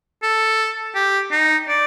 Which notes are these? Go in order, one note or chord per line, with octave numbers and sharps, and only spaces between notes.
A4
G4
D#4
D5